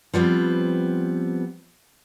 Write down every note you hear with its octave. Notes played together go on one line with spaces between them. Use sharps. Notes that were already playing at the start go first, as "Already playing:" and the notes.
F3 G3 B3 C4